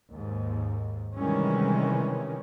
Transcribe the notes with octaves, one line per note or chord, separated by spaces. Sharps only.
D#2 G#2
C3 D#3 E3 G3 G#3 C#4